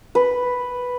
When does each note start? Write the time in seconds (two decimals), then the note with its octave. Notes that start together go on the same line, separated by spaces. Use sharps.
0.15 B4